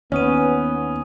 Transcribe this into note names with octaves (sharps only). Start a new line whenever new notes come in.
D#2 B3 C#4 G#5 D#6 D#7